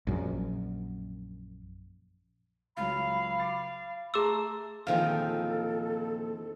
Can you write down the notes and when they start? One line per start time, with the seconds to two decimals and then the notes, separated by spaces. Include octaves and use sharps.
0.07 A#1 F#2
2.77 C#2 F#3 F5 B5
3.39 D6 A6 C7
4.14 A3 G#4 A#5 C6 D6 E6 A6
4.87 E2 A#2 D#3 F3 C4 A4 F5